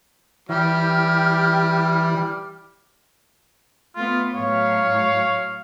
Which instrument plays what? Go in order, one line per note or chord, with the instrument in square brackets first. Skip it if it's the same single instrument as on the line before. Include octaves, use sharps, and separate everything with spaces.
[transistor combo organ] E3 [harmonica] G3 [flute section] G4 F6
[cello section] A3 B3 [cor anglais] F4
[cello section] A2 F#3 [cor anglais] C#5 [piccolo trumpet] F5